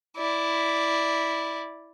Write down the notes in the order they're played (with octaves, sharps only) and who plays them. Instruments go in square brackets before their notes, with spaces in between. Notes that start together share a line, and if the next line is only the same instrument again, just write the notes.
[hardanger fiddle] E4 D5